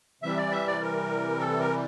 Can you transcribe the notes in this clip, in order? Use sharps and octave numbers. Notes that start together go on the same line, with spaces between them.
C3 E3 G3 E5
D5
E5
D5
A#4
A4
A#4